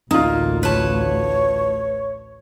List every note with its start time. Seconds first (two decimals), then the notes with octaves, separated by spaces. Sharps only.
0.11 A1 D2 A#3 D#4 F4
0.63 B4 C#5 A5